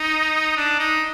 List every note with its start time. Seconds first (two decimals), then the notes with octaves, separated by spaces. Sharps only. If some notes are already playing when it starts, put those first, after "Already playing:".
Already playing: D#4
0.57 D4
0.79 D#4